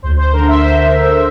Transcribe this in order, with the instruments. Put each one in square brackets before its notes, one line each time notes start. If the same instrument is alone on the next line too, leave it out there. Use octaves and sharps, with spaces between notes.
[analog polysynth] D2 C5
C5
D3 A#4
E5
D2 C5
D3